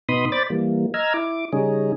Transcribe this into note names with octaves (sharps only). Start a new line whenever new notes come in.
B2 B3 D#4 B5 C6 D#6
C5 D5 B5 D6 A6
E3 G3 A#3
D#5 A#5 E6 F6 G#6
E4 D6
C#3 G3 C#4 D#4 G#4